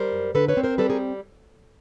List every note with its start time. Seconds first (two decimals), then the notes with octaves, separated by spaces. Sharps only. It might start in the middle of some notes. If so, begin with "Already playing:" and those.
Already playing: G3 A#4 C5
0.12 F#2
0.35 D3 A4 B4
0.48 B4 C#5
0.57 C4
0.64 A#4 C5
0.78 G3 A4 B4
0.90 G#4 A#4